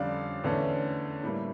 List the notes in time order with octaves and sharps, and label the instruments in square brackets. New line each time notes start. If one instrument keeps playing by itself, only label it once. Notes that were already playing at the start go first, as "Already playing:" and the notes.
Already playing: [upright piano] F2 D3 G3 C#4 D5 F5
E2 D3 A3 C#4
A2 G3 A#3